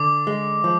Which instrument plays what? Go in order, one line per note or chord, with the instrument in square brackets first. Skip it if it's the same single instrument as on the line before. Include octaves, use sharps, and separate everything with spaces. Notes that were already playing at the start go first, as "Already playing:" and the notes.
Already playing: [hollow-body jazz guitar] D3 [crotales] D6
[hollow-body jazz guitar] G#3
F3